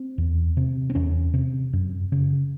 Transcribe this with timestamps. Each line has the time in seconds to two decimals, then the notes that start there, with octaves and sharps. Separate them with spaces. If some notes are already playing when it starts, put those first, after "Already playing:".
Already playing: C4
0.18 E2
0.57 C3
0.90 C4
0.95 E2 C#4
1.34 C3
1.73 F#2
2.12 C#3